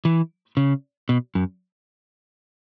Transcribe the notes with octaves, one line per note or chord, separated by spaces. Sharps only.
E3
C#3
B2
F#2